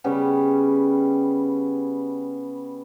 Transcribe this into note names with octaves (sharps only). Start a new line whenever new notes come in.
C#3 G3 B3 C#4